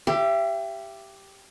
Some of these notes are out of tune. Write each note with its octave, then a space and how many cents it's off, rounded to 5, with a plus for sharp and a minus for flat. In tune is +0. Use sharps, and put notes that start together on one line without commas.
G4 +0 E5 +35